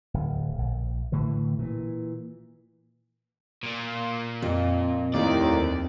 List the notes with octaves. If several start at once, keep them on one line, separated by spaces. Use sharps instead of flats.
D1
A#1
A2 D3 E3
A#2 E3
A#2 A#3
F2
D#2 A2 C3 D#3 D5